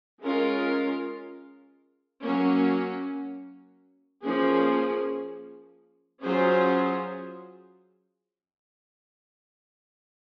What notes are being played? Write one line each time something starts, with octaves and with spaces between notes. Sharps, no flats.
G#3 C#4 F4 A#4
F#3 A#3 C#4
F3 A#3 C#4 G#4
F#3 C#4 F4 G#4 C5